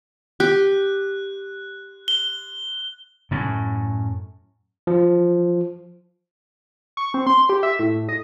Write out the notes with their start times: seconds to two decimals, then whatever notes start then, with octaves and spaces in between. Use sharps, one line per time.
0.40 G4 F#6
2.08 G7
3.31 F#2 A2
4.87 F3
6.97 C#6
7.14 C4
7.27 C6
7.49 G4
7.63 E5
7.79 A2
8.09 D#5